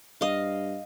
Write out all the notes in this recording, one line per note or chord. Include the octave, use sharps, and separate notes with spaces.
G2 D#5 F5